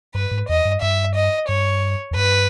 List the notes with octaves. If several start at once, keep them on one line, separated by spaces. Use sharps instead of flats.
G2 B4
G#2
E2 D#5
G2
G2 E5
D#5
G2 C#5
E2
G2 B4